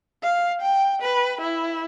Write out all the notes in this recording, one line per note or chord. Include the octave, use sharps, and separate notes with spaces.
F5
G5
B4
E4